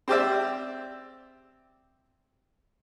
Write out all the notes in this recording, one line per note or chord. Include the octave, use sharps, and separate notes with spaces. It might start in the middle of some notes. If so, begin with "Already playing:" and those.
C4 G4 D5 E5